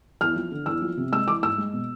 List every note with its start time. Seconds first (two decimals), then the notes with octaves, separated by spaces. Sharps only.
0.21 E2 F6
0.36 F3
0.52 D3
0.66 E2 E6
0.82 F3
0.97 C3
1.12 G#3 E6
1.27 E3 D6
1.43 G#2 E6
1.58 G#3
1.73 B2